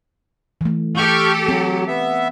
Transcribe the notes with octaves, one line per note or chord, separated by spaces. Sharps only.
E3 A3
G4 A4 C#6 F6 G6
F#3 C4
B3 E5